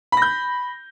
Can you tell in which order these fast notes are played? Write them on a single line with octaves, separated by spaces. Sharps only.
B5 A#6 G6